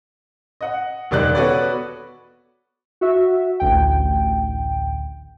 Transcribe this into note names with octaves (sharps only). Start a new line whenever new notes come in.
D#5 F#5
E1 D#3 G3 D5 D#5 F#6
B3 F#4 A4 B4 C#5 D5
F#4 E5
A1 D2 G5